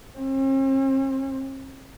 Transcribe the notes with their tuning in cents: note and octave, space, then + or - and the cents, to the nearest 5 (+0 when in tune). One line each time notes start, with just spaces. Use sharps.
C4 +45